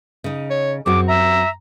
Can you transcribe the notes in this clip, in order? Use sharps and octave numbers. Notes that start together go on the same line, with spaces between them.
C#3 D#4
C#5
F#2 C4 F#4 G#4 D6
E5 A#5